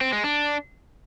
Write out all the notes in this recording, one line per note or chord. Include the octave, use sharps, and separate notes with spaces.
C4
G#3
D4